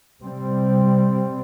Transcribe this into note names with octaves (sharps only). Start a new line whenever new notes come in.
C3 G3 C4